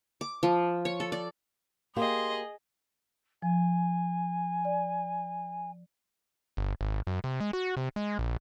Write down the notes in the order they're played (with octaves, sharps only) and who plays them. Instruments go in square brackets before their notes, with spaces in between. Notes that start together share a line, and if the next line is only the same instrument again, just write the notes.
[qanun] D6
F3
C#5
A4
D5
[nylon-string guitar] A#3 G4 [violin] G#4 D#5 [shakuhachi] C6
[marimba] F3 [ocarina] G#5
[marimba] D5
[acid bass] G1
G#1
F#2
C3
G#3
F#4
C3
G#3
A#1